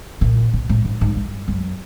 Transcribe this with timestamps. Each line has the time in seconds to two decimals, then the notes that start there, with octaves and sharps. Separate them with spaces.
0.21 A#2
0.53 B2
0.69 A2
0.85 G#2
1.01 G#2
1.16 G2
1.48 F#2